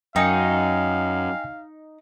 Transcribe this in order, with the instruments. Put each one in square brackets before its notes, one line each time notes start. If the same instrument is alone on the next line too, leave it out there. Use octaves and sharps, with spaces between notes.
[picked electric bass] F#2 [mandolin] D#4 [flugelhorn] F5 [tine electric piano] G5 G#5 C#7